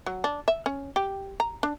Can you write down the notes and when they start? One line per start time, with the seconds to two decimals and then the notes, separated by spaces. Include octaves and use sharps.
0.06 F#3
0.24 D4
0.48 E5
0.66 C#4
0.96 G4
1.40 A#5
1.63 D4